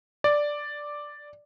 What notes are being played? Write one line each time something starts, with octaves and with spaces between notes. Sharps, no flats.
D5